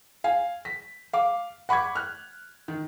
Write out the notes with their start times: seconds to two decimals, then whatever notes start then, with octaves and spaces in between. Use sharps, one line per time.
0.24 F5 G#5
0.65 B6
1.13 F5 D6
1.69 F#5 B5 C#6 D6 G#6
1.96 F6 F#6
2.68 D#3